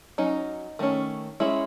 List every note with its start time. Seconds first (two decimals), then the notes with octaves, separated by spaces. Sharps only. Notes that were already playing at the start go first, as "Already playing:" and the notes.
0.18 F#3 C#4 D#4
0.79 D#3 A3 C#4
1.40 G#3 C#4 E4